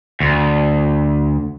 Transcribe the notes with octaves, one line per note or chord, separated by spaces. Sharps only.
D2